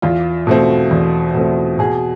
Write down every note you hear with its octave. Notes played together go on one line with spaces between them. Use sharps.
E2 F4
B2 A3 C4
E2
B2 A3 C4
B2 G#4